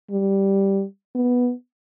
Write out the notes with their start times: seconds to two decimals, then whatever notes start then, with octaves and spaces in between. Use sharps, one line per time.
0.10 G3
1.15 B3